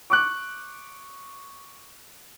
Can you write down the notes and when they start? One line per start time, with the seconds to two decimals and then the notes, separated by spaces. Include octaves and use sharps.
0.10 C#6 D6 F#6